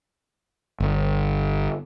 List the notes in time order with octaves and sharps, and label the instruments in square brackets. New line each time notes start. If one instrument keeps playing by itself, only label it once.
[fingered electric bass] G1